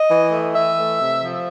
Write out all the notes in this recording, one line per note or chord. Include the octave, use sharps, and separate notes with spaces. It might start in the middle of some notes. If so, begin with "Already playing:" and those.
Already playing: D#5
E3
A3
E3 E5
A3
C3
F3